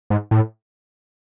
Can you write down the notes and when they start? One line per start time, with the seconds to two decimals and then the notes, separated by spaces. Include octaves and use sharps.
0.10 G#2
0.31 A2